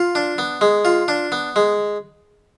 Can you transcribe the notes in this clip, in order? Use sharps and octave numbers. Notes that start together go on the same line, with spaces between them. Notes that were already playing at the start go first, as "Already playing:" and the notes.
Already playing: F4
D4
B3
G#3
F4
D4
B3
G#3